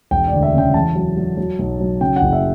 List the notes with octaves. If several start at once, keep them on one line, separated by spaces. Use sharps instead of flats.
E1 G5
D2 D5
E5
C#3 G5
E2 A5
F#3
F#3
F#3
B1
F#3
C#3 G5
F#5
F#1
E5